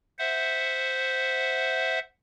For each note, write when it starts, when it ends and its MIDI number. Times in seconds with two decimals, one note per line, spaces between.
0.19 1.99 72
0.19 1.99 76
0.19 1.99 78